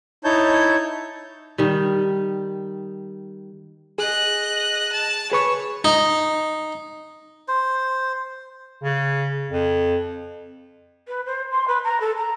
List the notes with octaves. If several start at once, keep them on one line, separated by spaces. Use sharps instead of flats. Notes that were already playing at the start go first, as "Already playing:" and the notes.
D#4 E4 C#5 A5 G6
D#3 G3
G#4 D#5 F#6
A5
G#4 B4 C#5 C#6
D#4
C5
C#3
F2
B4
C5
C6
B4
A#5
A4
A#5